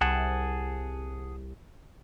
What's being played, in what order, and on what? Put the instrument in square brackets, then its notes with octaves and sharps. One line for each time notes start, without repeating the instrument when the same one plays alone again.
[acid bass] C2 [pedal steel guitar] G#4 F#5 A5